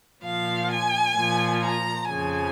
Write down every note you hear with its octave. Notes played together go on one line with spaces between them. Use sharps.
A#2 F3 F5
G#5
A#2 F3
A#5
F2 C#3 F3 G#5